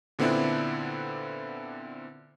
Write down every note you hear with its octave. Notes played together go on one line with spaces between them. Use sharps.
A#2 D3 B3 C4 D4 E4